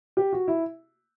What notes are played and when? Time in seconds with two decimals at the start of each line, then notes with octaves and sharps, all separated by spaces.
0.17 G4
0.33 F#4
0.48 E4